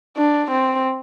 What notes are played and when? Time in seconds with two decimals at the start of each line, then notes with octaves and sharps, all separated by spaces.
0.17 D4
0.51 C4